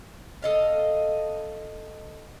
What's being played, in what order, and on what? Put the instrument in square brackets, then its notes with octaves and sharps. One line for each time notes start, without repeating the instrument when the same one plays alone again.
[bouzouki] A4 D#5 F5